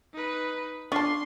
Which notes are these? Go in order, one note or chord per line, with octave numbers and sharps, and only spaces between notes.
D#4 B4
C#4 D4 F4 A5 C6 C#6